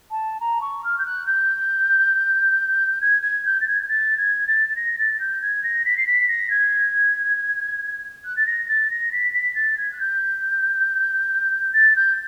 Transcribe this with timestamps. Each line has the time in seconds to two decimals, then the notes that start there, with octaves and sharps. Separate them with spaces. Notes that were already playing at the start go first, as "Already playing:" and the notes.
0.11 A5
0.40 A#5
0.61 C#6
0.84 F6
0.98 G6
1.06 F#6
1.27 G6
3.01 G#6
3.23 G#6
3.46 G6
3.60 A6
3.67 G#6
3.82 G#6
3.89 A6
4.17 G#6
4.47 A6
4.69 A6
4.76 A#6
4.98 A6
5.20 G6
5.42 G#6
5.63 A#6
5.85 B6
5.97 C7
6.06 B6
6.28 A#6
6.50 G#6
8.25 F#6
8.36 A6
8.46 A#6
8.68 A6
8.90 A#6
9.12 B6
9.34 B6
9.55 A6
9.78 G#6
9.92 F#6
9.99 G6
11.73 A6
11.96 G6